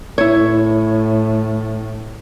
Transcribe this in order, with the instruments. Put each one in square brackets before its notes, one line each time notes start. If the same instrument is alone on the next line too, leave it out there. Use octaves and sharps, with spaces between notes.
[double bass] A2 [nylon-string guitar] E4 C#5